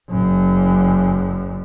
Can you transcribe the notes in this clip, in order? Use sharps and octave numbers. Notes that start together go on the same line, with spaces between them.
F#1 F#2